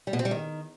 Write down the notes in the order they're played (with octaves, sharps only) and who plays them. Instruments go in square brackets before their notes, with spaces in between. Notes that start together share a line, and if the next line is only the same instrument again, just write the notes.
[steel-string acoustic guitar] G3
B2
C4
G3
D#3